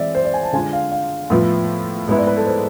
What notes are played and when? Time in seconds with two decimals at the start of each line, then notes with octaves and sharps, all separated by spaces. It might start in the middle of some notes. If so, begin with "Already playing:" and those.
Already playing: E3 G#3 C4 E4 D5 E5
0.15 C5
0.25 D5
0.34 G#5
0.43 A5
0.53 D3 G#3 D4 F4 G#5
0.73 F5
0.92 F5
1.30 A2 F3 B3 F4 E5
2.08 G#2 G#3 B3 E4
2.18 D5
2.27 B4
2.37 A4
2.46 C5